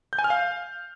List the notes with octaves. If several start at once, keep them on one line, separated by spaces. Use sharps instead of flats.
G6
G#5
F6
F5